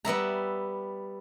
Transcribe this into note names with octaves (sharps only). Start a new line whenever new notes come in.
G3 B3 E5 A#5